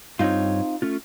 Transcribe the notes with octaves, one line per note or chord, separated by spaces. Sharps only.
G2 C4 D#4 F4 C#5
A3 C#4 F4